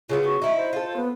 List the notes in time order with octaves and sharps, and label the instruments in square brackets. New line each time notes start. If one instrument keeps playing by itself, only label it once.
[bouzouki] C#3 F#3 B3 [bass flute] F4
[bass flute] F#4
[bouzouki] D#4 E4
[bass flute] C5
[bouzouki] F4 A4
[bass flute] B3